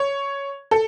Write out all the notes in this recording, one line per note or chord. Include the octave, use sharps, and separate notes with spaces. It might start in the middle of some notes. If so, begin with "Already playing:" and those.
Already playing: C#5
A4